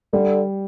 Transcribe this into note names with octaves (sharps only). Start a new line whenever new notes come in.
D3 G3